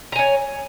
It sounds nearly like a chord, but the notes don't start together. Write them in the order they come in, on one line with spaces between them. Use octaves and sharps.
A#5 G#5 C#5